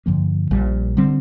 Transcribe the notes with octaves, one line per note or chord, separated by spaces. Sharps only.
G2 D3 F3 A#3
A#1 A#2 G3
D3 G3 C4